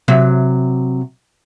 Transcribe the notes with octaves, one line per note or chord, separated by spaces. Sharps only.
C3 F#3 E5